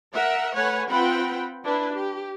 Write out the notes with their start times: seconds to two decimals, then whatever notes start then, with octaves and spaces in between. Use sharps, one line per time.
0.14 A#4 E5 F#5
0.55 A3 B4 C#5 F#5 G#5
0.90 C4 F4 B4 F#5 G5 B5
1.65 D4 E4 B4
1.95 G4